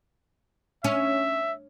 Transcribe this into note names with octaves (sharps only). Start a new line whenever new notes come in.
C#4 E5